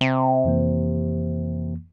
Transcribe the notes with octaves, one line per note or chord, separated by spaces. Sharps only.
C3
F2 E3 A#3